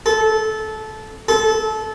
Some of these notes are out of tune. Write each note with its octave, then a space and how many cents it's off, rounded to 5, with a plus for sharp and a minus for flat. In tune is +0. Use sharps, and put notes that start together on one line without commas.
A4 -20
A4 -25